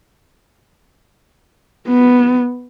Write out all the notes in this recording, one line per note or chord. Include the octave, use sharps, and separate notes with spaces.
B3